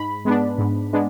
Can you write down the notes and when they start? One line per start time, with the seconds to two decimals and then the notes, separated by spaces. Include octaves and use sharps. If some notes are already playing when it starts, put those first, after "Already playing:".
Already playing: G#2 B5
0.25 G#3 B3 D4
0.58 G#2
0.93 G#3 B3 D4